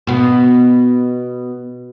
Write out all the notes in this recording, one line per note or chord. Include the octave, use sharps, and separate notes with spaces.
B2 B3